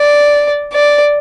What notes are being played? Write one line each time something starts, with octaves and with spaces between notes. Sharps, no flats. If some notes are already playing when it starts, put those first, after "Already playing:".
Already playing: D5
D5